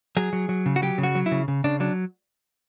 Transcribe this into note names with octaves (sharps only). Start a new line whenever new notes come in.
F#3 G#4
F#3
F#3
C#3
F#4
F#3 G4
C#3
F#4
F#3
E4
C#3
C#3
C#3 D4
F#3 D4